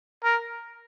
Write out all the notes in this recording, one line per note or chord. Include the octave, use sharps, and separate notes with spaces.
A#4